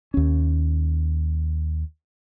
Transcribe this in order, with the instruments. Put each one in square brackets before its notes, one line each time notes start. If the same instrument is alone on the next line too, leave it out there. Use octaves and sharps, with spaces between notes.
[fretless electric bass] D#2 C#4